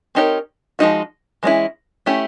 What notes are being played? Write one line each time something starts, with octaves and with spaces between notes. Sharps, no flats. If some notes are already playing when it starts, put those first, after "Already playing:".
C4 D#4 G4 A#4 C#5
F3 G#3 B3 D#4 F#4
E3 G#3 C#4 E4
A3 C#4 E4 G4